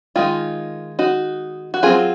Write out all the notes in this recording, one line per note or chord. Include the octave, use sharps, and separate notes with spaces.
D#3 G#3 D#4 F4
D#4 F#4
F#4
F#3 C4 D#4 F4 G#4